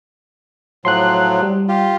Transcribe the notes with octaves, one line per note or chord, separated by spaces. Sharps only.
A2 F3 F#3 C6 F#6
G3
F4 G4